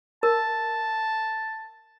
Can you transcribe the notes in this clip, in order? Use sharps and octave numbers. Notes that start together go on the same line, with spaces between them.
A#4 A5